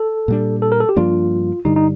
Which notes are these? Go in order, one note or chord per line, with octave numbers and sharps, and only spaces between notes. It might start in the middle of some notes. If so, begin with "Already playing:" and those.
Already playing: A4
A#2 G3 D4
A4
A#4
A4
G4
G2 F3 A#3 D4 F4
G2 D3 G3 D#4
D#4